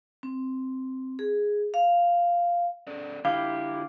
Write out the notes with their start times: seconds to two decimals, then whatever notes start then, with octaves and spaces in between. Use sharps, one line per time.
0.23 C4
1.19 G#4
1.74 F5
2.87 C4 A4 D5
3.25 D3 E4 F4 G4 F5